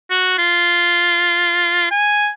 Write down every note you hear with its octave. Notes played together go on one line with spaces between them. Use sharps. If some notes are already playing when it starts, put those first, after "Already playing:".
F#4
F4
G#5